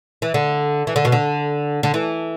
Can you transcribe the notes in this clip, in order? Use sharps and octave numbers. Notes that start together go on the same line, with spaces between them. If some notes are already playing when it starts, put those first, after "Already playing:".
E3
D3
E3
D3
B2
D3
D3
E3